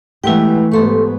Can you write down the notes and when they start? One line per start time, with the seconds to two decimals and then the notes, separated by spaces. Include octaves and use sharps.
0.24 E3 G#3 A3 B3 E4 G4 B4 G5
0.72 G#2 A3 B3 G4 A4 C6 C#6